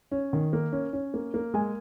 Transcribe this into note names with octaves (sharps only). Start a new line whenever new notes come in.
C#4
D#3
A#3
C#4
C#4
A#3
A#3
G#3 G#5